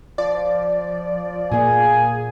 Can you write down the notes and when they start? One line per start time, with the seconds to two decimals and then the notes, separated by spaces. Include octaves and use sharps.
0.18 F3 D5
1.52 A#2 A#3 G#4 G#5